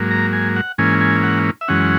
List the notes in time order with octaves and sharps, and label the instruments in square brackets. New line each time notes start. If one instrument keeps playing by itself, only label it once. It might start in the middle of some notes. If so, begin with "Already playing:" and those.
Already playing: [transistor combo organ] G#2 F#3 A#3
A#5
G#5
F#5
G#2 E3 A#3 C#4 G#5
G#5
F#5
E5
F#2 E3 G#3 C#4 F#5